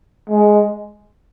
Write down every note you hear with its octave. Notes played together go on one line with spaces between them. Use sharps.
G#3